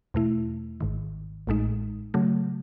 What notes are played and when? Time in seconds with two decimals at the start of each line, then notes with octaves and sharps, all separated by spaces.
0.14 E2 B2 A3 E4
0.81 G#1 G#2 D#3
1.47 A1 A2 G#3 D#4
2.14 C#3 F#3 A3